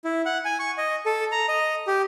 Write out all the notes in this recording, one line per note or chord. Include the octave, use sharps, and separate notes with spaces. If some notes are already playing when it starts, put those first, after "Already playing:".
E4
F#5
G#5
C#6
D#5
A4
A#5
D#5
G4